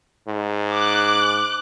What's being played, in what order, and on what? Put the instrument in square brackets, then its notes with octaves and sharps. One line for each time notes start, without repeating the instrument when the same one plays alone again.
[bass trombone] G#2
[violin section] D6 F#6